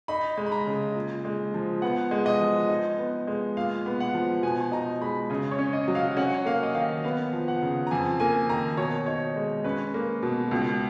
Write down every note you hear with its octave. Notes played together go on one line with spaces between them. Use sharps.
D#4 B5
G#3
B5
A#5
C#3
A#2
G#3
F3
B3 F#5
G#3
D#5
F3
D#4
B3
G#3
A#2 F5
B3
F#5
F3
B2 G#5
D#4 A#5
G#3 B5
C#3 D#5
C#5
C#4
D#5
F#3
F5
C#4 F#5
A#3 F5
D#5
D#3 F5
B3 F5
F3
F#5
C#3
A#5
F2 G#5
A#3 G#5
D#3 A#5
B2 C#5
D#4 C#5
G#3
C#4 B4
A#3
B2
C#2